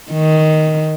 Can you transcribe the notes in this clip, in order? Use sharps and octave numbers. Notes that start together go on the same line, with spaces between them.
D#3